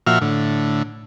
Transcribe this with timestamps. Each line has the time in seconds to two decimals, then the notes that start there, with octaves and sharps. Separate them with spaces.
0.07 A#2 F3 F#4 E5 F6
0.22 A2 D3